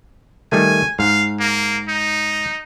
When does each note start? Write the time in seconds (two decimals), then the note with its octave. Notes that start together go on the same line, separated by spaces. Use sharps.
0.52 D#3 G3 A3 G#5
0.99 G#2 F5
1.40 A#3
1.88 D#4